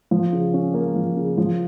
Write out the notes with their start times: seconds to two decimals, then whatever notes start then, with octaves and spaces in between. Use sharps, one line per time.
0.11 F3
0.33 C#3
0.54 C#4
0.74 A#3
0.95 F3
1.17 C#3
1.38 F3